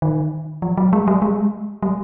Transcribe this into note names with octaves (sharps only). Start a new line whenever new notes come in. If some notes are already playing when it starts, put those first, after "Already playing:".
D#3
F3
F#3
G#3
G3
G#3
G3